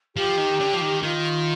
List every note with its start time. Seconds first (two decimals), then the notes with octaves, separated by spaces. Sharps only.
0.16 F3 G4
0.37 D#3
0.59 D3
0.73 F3
0.81 D#3
1.03 D#3 F4